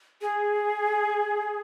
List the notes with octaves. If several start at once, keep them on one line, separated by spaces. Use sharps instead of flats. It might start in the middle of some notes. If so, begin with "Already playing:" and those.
G#4